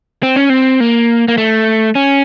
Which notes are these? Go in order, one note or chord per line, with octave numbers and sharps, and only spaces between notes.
C4
C#4
C4
A#3
A#3
A3
C#4